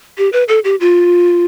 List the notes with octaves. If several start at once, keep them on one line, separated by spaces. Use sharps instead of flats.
G4
B4
A4
G4
F4